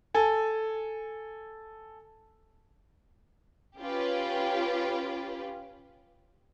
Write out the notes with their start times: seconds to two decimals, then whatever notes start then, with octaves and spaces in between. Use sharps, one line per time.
0.14 A4 G#5
3.79 C#4 F4 G4 B4